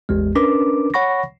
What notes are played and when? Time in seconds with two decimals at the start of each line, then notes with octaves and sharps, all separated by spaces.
0.09 A1 E2 G#3
0.35 C#4 D4 A#4 B4 D6
0.94 C#5 F#5 B5 C#6 A#6